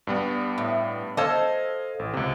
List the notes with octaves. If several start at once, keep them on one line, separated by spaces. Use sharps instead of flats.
G2 G3 B3
A2
A4 C5 D#5 F5 A5 G#6
A1
C#2 C3